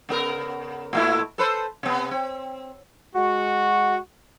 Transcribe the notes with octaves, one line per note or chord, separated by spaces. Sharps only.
C#3 B3 A#4
A#2 A3 E4
A4 B4 C5
C3 B3
C4
G#3 F#4